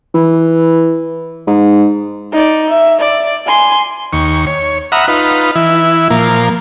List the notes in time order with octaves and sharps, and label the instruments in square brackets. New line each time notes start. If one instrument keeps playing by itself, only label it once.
[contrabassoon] E3
G#2
[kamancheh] D#4 D5
E5
D5
G#5 C6
[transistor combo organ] D#2 C#6
C#5
E5 F#5 A#5 B5 D#6 F6
D#4 F4 B4
E3 E4
A#2 F3 A#3